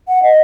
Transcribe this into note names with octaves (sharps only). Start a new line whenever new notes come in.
F#5
D#5